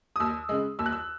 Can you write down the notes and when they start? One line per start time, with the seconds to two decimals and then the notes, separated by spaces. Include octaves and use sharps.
0.16 D#6
0.20 D#2 E6
0.49 C#3 G#3
0.79 D#2 E6
0.86 F#6
0.92 E6